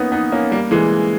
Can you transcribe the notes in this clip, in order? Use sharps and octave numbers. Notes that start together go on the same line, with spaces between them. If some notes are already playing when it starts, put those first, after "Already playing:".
Already playing: A#3 B3 C#4 D#4
B3 D#4
A#3 C#4
G3 A#3
E3 G#3